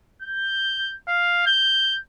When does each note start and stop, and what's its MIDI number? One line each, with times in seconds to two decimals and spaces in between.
0.22 0.94 91
1.09 1.46 77
1.47 1.97 91